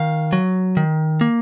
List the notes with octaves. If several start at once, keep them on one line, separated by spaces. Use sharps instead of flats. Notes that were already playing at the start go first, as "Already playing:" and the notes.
Already playing: D#3 F5
F#3
D#3
A#3